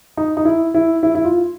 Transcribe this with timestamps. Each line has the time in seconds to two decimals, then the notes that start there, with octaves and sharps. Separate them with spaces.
0.17 D#4
0.37 D#4
0.45 E4
0.74 E4
1.03 E4
1.15 E4
1.25 F4